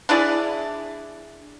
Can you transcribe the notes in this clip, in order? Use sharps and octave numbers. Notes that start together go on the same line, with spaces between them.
D4 E4 G#4 D5